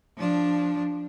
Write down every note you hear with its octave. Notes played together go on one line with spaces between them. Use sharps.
F3 D4